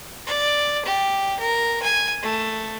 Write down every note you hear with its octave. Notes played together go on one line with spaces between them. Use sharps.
D5
G4
A#4
G#5
A3